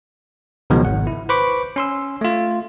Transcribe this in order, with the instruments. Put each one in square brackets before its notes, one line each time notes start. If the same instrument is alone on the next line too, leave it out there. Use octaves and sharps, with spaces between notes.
[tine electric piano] C#2 B2 D#3 F3 F#3 G#3
G#1 F#5
E4
B4 C5 B5 C#6 D6
C#4 C6 E6
A3 F4